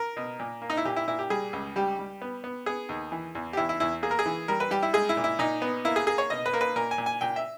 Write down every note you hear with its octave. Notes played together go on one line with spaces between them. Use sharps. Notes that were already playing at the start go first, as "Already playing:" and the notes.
Already playing: A#4
B2
A#2
A#3
D#4
E4
A#2 G4
E4
A#2 E4
G4
G3 G#4
C#2
G3 G4
G3
B3
B3
B3 G#4
D#2
E3
E2
G4
E2 E4
E4
E2 E4
A#3 G#4
A#4
G#4
E3
G3 A#4
B4
G3 G4
E4
G#3 G#4
E4
A#2
E4
A#2 D#4
B3
A#3 E4
G#4
A#3 G#4
C#5
B2 D#5
B4
A#3 A#4
B4
A#2 A#4
G#5
A#2
G#5
A#2 G5
E5